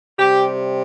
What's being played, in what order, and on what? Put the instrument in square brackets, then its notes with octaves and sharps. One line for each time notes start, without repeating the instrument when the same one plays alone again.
[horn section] C3 G3 G4